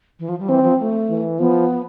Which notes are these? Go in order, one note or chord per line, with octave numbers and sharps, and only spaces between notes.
E3
F3
G3
E3 C4
F3
A3
E3
F3 B3